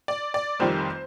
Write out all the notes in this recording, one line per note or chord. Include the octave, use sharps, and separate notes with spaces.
D5
D5
F1 F2 D#3 G3 C5